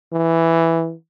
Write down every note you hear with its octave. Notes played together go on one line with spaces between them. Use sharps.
E3